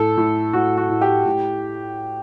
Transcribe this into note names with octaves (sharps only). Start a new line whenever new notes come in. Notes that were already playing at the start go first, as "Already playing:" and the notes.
Already playing: A2 A4
A2
A2 F#4
F#4
A2
G4
A2